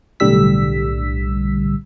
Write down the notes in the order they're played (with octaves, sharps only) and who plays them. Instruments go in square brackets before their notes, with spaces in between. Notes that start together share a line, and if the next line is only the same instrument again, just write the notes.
[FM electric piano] B1 A2 D3 G3 E6 B6